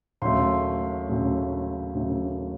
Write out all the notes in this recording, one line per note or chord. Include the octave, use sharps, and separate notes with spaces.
D#2 C#3 F#3 A3 C6
D#2 C#3 F#3 A3
D#2 C#3 F#3 A3